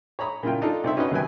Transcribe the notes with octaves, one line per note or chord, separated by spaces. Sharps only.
C#5 A#5 B5 D#6
A#2 C#3 E4 F4 G5
D4 D#4 F4 A4
C2 D#4 C5 E5
C#4 D#4 F#4 B4 D#5
D#2 C3 F#3 B4 G5 G#5